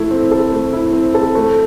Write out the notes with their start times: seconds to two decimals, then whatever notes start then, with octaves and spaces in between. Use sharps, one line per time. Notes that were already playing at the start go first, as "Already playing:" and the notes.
Already playing: A3 E4
0.11 C4
0.31 A4
0.52 A3
0.73 E4
0.93 C4
1.14 A4
1.35 A3